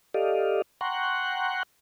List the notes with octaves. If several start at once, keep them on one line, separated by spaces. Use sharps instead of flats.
G4 A4 D5 D#5 F5
F#5 G5 A#5 C6 C#6 F#6